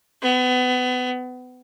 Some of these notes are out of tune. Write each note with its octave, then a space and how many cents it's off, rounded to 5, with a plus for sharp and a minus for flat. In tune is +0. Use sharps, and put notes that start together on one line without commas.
B3 +30